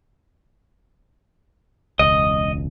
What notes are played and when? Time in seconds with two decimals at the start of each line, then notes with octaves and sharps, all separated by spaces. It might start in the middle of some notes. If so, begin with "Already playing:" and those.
1.99 E1 C#2 D#5